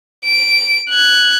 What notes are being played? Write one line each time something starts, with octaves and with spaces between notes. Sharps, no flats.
D7
F#6 G#6